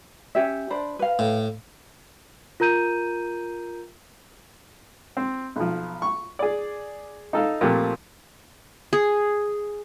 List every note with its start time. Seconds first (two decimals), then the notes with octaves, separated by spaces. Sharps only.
0.35 C#4 G4 E5
0.70 D4 C5 B5
0.99 B4 F5
1.19 A2
2.60 F4 A#4 A#5 G6 D#7
5.17 C4
5.56 B1 F3
6.02 C#6
6.39 G#4 D5
7.33 D#4 A4 F5
7.61 A#2 F3 A3 C4 G4
8.93 G#4